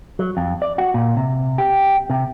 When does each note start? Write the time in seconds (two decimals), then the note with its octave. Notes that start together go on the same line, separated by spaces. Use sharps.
0.19 F#3
0.37 F2
0.62 D5
0.78 F#4
0.94 A#2
1.17 C3
1.58 G4
2.10 C3